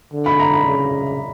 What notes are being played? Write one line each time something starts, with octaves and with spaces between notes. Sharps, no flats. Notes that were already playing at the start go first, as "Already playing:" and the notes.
D3
B5
A#5
B5
C#3